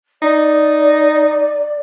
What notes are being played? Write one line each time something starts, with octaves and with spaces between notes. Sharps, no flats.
D#4 D5